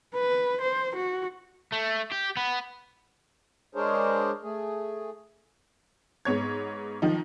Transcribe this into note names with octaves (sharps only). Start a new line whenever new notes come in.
B4
C5
F#4
A3
G4
B3
G#3 D4 G#4 A#4 C5 C#5
A3 G#4
G#2 B3 C#5 G#6
D#3 F3 D#4